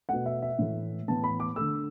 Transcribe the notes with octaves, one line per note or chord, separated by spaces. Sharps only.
B2 A3 F#5
E5
E5
A2 E3 A3
A2 E3 B3 A5
B5
D6
D3 A3 E6